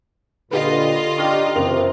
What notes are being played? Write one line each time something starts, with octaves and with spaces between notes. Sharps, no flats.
A#2 D3 F4 G4 B4 D#5
D4 D#4 G4 C#6 F6 A#6
F#1 C3 E3 C4 A#4 F7